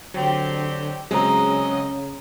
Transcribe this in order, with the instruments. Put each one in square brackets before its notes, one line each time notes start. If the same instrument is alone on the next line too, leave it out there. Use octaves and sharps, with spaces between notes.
[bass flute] D3 [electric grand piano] F#3 [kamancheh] C4 G4
[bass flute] C#3 [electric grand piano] F#3 G#3 C4 [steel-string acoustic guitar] G#4 A#5 [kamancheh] D#5